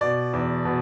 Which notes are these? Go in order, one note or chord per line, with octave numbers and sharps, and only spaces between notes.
B2 D5
E2
B2